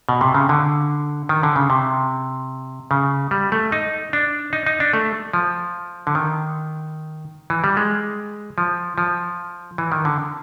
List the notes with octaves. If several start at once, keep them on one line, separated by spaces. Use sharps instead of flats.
B2
C3
C#3
D3
D#3
D3
C#3
C3
C#3
G3
A3
D#4
D4
D#4
D#4
D4
A3
F3
D3
D#3
E3
G3
G#3
F3
F3
E3
D#3
D3